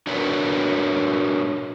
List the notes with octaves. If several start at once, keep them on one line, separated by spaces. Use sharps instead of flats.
D4 F#4 A#4 B4 C#5